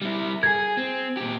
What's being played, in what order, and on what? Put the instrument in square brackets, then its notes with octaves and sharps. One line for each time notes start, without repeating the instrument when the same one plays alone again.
[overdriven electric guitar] G3 E4
[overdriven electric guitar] G#4 A#4 [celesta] G#6
[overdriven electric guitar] C4
A#2 G4